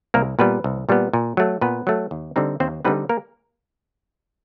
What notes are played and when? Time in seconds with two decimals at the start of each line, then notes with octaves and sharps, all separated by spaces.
0.14 C2 A#3 A#4
0.39 A#2 G3 B3 B4
0.64 C2
0.89 A#2 G3 B3
1.13 A#2
1.37 F#3 A3
1.61 A#2 B3 B4
1.87 F#3 A3
2.11 D#2
2.36 D3 G3 C4 D#4
2.60 D#2 C4 C5
2.85 D3 G3 B3 C4 D#4 B4
3.09 A#3 A#4